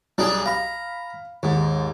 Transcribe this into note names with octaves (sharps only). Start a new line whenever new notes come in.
B1 G3 D4 G#4
F5 A#5 B5
D#2 G#2